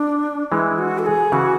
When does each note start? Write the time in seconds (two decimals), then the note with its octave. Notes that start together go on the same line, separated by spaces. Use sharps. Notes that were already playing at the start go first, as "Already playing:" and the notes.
Already playing: D4
0.52 E3 G#3 E4
0.78 F#4
0.99 A4
1.06 G#4
1.32 C#3 E3 F#4